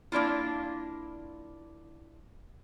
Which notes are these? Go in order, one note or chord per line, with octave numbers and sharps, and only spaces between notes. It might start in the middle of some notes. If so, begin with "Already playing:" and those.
A#3 D4 E4 F4